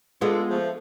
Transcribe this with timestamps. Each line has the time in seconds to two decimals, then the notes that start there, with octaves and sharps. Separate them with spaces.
0.21 G#3 B3 D4 F4 A4
0.50 F3 A3